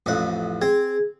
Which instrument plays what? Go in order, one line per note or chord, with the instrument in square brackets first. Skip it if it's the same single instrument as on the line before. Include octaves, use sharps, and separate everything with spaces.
[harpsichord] A1 F2 F#5
[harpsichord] C4 [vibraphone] G#4